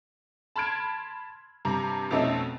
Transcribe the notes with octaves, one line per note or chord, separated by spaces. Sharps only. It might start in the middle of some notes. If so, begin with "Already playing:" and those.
A5 B5 C6 F6 G#6 D7
G2 C3 A#5
F2 B2 A3 C4 C#4 D#4